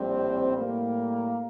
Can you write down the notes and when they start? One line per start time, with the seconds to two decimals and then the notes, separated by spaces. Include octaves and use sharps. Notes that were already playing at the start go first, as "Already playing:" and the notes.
Already playing: A#1 A2 G3 C4
0.56 A2 G3 A#3